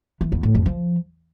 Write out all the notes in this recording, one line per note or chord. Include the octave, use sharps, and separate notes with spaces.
E3
E2
A2
F2
F3